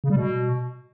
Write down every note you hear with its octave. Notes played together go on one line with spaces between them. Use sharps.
C#3
G3
B2